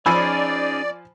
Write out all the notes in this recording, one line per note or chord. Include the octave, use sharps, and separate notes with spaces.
F3 C#4 D#4 G#4 D5 G#5 B5 E6